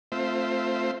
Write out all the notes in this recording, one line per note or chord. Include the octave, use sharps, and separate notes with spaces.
A3 C4 F4 C5 E5